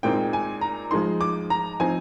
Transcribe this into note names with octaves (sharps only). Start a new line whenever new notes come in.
A#2 G#3 C4 D#4 G5
G#5
A#5
F3 G#3 D#4 C6
D6
A#5
F3 C4 D#4 G#5